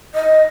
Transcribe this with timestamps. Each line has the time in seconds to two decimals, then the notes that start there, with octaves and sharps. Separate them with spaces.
0.15 D#5